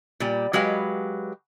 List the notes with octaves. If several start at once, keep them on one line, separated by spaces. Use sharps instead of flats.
A#2 G3
F#3 G#3 G4 B4 F5